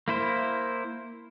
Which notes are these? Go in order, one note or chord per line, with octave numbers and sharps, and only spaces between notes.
A#3 E4 C5